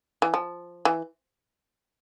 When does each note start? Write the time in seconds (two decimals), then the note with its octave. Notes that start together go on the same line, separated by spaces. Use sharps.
0.22 E3
0.34 F3
0.85 E3